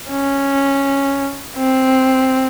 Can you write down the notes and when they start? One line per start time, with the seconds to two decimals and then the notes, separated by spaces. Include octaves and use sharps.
0.10 C#4
1.57 C4